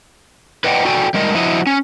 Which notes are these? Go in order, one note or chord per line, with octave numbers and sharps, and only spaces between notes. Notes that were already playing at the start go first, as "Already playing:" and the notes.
B4 D5 D#5 F#5 G5
F#4 A4 D5 G5 G#5
G3 G#3 A#4 D#5
F3 E4 F#4 D#5
C#4